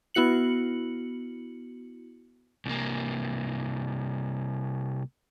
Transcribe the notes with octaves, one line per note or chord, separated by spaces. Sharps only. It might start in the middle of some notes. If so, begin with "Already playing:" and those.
B3 E4 F#4 C#7 F#7
C2 A#3